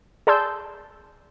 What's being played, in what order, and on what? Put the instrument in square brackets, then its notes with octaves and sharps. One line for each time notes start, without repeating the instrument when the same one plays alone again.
[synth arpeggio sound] G#4 D5 A5 C6 E6 G6